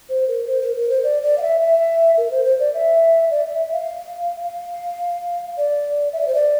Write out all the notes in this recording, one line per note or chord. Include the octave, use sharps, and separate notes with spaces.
C5
A#4
C5
A#4
A#4
C5
D5
D5
F5
E5
E5
A#4
C5
C5
D5
E5
D5
E5
E5
F5
F5
D5
E5
D5
C5
D5